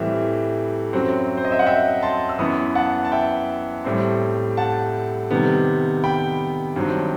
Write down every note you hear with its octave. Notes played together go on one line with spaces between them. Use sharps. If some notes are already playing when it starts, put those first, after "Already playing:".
Already playing: A2 E3 G3 C4 E5 G5
F#2 F#3 C4
C5
D#5
E5
F#5
E5 G5
A5 C6
E6
F#2 E3 B3 B5 D#6
F#5 A5
A5
E5 G5
A2 G3 C4
F#5 A5
C3 D#3 G3 B3
G5 B5
G2 D#3 F#3 C4